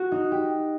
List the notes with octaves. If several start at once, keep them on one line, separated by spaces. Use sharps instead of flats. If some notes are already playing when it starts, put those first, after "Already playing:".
Already playing: F#4
D#4
G4